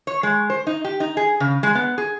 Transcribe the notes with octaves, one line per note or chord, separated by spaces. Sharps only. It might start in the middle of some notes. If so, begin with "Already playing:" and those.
C#5
G#3
C5
D#4
G4
D#4
G#4
C#3
G#3
B3
G#4